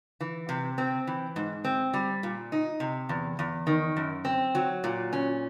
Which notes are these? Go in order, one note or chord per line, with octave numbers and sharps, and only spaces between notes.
E3
C3
C4
E3
G#2
C4
G3
A#2
D#4
C3
E2
E2
D#3
F#2
C4
F#3
A#2
C#4